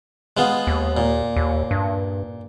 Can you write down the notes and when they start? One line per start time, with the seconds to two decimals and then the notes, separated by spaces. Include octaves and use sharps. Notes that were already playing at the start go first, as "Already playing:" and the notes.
0.37 G#3 B3 F4
0.67 D#2
0.97 A#2
1.36 D#2
1.71 G2